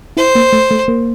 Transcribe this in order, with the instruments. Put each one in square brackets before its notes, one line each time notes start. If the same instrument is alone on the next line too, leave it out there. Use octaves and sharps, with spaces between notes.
[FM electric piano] E4 [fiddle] C5
[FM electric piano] A#3
A3
A3
A#3